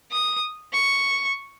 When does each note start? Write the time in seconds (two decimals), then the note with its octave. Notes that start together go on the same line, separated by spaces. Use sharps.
0.11 D#6
0.73 C#6